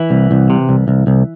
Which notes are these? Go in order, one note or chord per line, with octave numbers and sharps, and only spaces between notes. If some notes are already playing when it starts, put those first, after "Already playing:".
Already playing: E3 E4
C2
C2
C3
C2
C2
C2